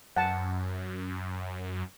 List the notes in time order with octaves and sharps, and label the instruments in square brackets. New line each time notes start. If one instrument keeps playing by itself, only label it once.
[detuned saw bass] F#2 [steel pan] F#5 A5